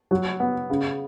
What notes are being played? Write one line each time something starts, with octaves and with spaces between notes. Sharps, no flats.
F#3
B3
C#3